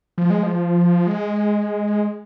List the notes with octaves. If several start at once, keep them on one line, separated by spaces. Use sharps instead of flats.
F3
G#3
F3
G#3